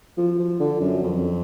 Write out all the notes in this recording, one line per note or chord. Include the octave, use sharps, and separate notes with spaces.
F3
F3
D3
F#2
F2